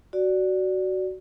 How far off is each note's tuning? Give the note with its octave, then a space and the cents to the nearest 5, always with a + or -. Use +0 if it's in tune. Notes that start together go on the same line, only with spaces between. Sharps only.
F#4 +15 D5 +0